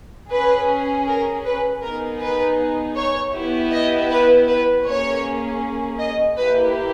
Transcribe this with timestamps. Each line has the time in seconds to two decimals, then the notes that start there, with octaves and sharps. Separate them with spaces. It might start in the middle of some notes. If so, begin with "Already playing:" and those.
0.31 C#4 G#4 B4
1.07 A#4
1.45 B4
1.83 B3 D#4 G#4 A#4
2.21 B4
2.96 C#5
3.34 B3 E4 G4
3.72 D#5
4.10 B4
4.48 B4
4.85 A#3 C#4 G#4 C#5
5.99 D#5
6.37 A#3 E4 G4 B4